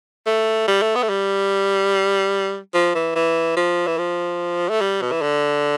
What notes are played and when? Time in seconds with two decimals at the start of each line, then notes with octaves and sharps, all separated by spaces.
0.26 A3
0.68 G3
0.82 A3
0.95 B3
1.03 A3
1.09 G3
2.74 F3
2.95 E3
3.16 E3
3.57 F3
3.87 E3
3.98 F3
4.69 A3
4.81 G3
5.02 B2
5.12 E3
5.22 D3